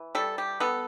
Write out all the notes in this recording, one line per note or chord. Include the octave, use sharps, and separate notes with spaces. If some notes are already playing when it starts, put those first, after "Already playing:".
Already playing: E3
G3 A4
G4
B3 A4